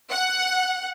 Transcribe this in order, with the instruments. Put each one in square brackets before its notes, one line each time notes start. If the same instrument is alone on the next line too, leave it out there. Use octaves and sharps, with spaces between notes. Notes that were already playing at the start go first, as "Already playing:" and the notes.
[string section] F#5